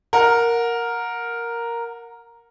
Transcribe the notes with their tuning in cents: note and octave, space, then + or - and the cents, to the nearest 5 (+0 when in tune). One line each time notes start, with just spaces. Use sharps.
A#4 +0 F#5 -25